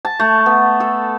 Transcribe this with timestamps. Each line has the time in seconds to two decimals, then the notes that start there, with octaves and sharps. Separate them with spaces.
0.05 A5
0.20 A3
0.46 B3
0.80 A4